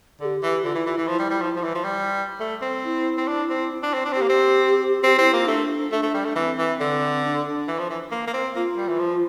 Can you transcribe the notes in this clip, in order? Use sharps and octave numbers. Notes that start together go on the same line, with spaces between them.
D3 G4 A4
E3
D3 F4
E3 E4
E3 F4
E3 E4
F3
G3
G3
F3
F3
E3
F3
G3
A3
C4
E4
C4
D4
C4
D4
C4
D4
C4 G4
A#3
C4
C4 G4
C4 E4
A#3 F4
A3 D4
A3 D4
A3
G3
A3
E3 C4
E3
D3
D4
D4
E3
F3
E3
A#3
A#3
C4
A#3 F4
G3
E3
F3